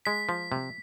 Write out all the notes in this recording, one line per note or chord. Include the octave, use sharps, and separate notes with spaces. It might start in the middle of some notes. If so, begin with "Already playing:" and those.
G#3 B6
F3
C3